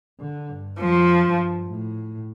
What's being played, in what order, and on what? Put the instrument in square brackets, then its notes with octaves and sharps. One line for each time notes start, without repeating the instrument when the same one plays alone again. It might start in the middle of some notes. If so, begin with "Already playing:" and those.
[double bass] D3
G2
[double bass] F2 [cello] F3
[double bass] G2
A2